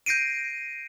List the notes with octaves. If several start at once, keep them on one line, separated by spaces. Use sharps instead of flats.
G6 A#6 C7 D7 D#7